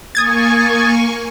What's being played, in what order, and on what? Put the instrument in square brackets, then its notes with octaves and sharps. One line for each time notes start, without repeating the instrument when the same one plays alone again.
[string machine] A#3 G#5 C#6 [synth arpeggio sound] D#6 G#6 A6